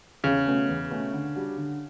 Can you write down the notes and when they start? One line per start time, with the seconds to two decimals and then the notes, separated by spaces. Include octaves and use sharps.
0.24 E2 C#3
0.46 B2 A3 C#4
0.68 E2
0.91 B2 A3 C#4
1.13 D3
1.36 G3 D4 F#4
1.58 D3